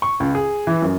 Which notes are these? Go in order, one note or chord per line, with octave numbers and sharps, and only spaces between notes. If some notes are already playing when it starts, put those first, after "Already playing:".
C#6
C#2
G#4
E3
F#2